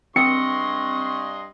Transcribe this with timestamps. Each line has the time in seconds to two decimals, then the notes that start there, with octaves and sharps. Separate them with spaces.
0.16 G2 C4 D#5 C6 C#6 C#7